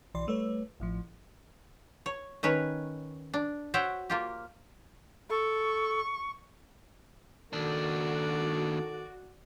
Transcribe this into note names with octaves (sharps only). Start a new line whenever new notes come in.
B1 E3 D5 C6
G3 A3 B4 C#5
A1 A2 F3
C#5
D#3 C#4 B4 C#5
D4
F#4 C5 C#5 E5 F#5 G5
A#3 F4 G4
A4 C#6
D#2 D#3 D4 F#4 A4 D5